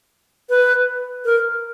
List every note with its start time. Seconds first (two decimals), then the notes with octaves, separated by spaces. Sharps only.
0.50 B4
1.25 A#4